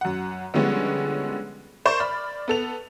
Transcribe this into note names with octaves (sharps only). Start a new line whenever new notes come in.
F#2 F#5
D3 F3 G3 G#3 B3 C#4
A#4 C5 D5 C#6
D5 B5 F6
B3 A4 F7